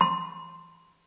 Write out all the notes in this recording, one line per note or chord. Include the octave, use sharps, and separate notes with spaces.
C6